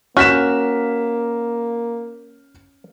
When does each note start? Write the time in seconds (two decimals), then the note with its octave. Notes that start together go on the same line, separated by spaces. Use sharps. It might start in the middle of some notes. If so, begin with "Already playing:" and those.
0.17 A#3 C#4 F#4 F6 B6 E7